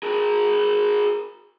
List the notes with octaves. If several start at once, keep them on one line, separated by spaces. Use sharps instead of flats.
G#4 A#4